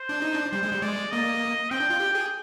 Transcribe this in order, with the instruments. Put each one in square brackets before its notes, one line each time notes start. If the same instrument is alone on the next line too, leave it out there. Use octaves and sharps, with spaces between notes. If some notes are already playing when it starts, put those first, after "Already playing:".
Already playing: [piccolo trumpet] C5
[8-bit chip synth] D4
D#4
D4
[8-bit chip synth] G3 [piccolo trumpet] C5
[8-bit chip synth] G#3
G3
[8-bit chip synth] G#3 [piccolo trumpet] D5
[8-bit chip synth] A#3 [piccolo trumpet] D#5
[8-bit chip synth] C4 [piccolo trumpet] G5
[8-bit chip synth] D4
F4
G4
G#4